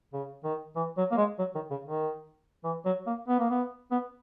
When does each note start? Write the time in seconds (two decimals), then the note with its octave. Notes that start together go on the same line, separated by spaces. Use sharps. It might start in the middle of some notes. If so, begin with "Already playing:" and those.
0.13 C#3
0.44 D#3
0.76 E3
0.97 F#3
1.11 A#3
1.17 G#3
1.39 F#3
1.55 D#3
1.71 C#3
1.86 D#3
2.64 E3
2.85 F#3
3.07 A#3
3.28 B3
3.39 A#3
3.50 B3
3.91 B3